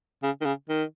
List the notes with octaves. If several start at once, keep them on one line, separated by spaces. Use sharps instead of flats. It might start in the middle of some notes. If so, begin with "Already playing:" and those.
C#3
D#3
C#3
D#3